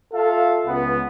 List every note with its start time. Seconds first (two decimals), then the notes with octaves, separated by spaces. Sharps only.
0.13 F4 A4 E5 F5
0.66 C#2 B3